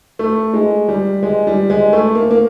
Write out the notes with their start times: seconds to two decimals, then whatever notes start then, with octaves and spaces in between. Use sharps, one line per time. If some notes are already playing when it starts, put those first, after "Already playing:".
0.19 A3
0.54 G#3
0.88 G3
1.23 G#3
1.47 G3
1.70 G#3
1.93 A3
2.15 A#3
2.31 A#3